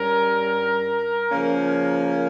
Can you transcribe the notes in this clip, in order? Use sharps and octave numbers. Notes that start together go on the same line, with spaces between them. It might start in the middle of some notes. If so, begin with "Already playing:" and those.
Already playing: G2 G3 C#4 A#4
C#3 F3 A#3 C#4